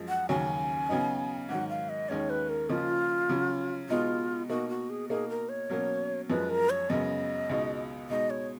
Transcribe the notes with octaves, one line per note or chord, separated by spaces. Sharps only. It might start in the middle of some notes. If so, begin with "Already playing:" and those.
Already playing: F#2 F3 G#3
F#5
D#2 C#3 F#3 C#4 G#5
C#3 F#3 B3 D#4
G#2 D#3 F#3 F#5
F5
D#5
D#2 D#3 G#3 C#4 C#5
B4
A#4
C#3 F3 A#3 D#4 F4
C#3 F#3 C#4
B2 G#3 B3 D#4 F4
B2 A#3 D#4 F#4
F#4
G#4
B2 A#3 D#4 G#4
A#4
C#5
B2 F#3 A#3 C#4
F#2 F3 G#3 B4
A#4
C#5
F#2 C#3 G#3 B3 D#5
C#2 B2 G#3 D#4
B2 G#3 D#4 D#5
C#5